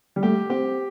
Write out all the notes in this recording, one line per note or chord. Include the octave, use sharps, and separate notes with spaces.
G3
A3 G4
C4 G4